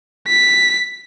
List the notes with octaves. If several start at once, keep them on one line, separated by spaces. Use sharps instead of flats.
B6